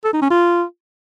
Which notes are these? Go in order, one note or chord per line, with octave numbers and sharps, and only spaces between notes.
A4
D#4
C#4
F4